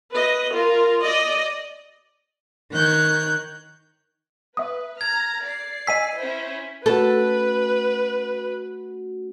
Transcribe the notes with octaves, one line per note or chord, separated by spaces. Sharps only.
B4 D#5
F4 A#4
D5 D#5
D#3 C#5 F#6 G6
B4 E5 D#6
A#5 F6 G#6
D5 C7
D#5 G#5 E6 B6 D#7
C#4 E4 C5
A3 C#4 F#4 A4 B4